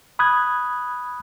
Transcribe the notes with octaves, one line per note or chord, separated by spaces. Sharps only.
B5 D#6 F#6 G#6